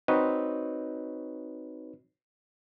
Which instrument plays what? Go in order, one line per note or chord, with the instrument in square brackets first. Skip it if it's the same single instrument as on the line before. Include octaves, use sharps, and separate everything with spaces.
[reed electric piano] C4 D#4 F#4 B4 C#5 D#5